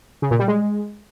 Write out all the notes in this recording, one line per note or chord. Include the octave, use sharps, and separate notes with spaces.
C#3
A#2
G3
G#3